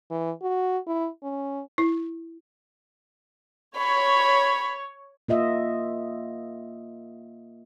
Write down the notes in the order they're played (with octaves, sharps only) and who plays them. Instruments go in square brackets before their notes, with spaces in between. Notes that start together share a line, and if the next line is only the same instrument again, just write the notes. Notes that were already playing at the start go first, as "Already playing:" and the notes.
[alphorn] E3
F#4
E4
C#4
[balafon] E4
[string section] C#5 [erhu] B5
[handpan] A#3 F4 D#5 E5